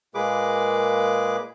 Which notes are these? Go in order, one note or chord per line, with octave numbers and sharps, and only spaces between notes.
A#2 G#3 A#3 G#4 B4 D6